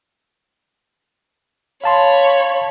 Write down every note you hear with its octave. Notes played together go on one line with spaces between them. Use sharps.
C#5 F5 A5 B5 C6